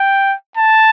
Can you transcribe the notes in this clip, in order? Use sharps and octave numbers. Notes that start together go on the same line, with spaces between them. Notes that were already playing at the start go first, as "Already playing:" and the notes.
Already playing: G5
A5